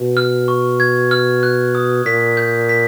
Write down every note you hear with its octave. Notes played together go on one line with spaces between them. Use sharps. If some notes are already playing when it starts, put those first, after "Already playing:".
Already playing: B2
F6
C#6
G#6
F6
F#6
D#6
A#2 B6
G6
B6